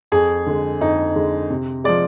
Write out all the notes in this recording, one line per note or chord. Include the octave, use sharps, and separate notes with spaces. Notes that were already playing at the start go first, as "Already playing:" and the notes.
F2 G#4
D3 G#3
F2 D#4
D3 G#3
C3
F3 G#3 D5